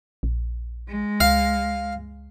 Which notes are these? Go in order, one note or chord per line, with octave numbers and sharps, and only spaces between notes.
A#1
G#3
C#2 F5